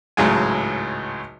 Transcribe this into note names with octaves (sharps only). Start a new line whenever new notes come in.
G#1 C#2 A2 F#3 G#3 G#5